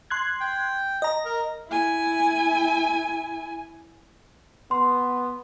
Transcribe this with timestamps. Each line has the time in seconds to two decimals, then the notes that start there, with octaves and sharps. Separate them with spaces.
0.10 C6 F#6 G#6
0.41 G5
1.02 D#5 A#5
1.26 A#4
1.68 E4 G#5
4.71 B3 C6